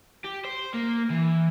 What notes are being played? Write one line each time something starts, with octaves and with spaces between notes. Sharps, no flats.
G4
C5
A#3
E3